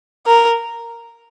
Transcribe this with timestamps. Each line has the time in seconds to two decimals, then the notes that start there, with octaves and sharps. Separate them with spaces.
0.26 A#4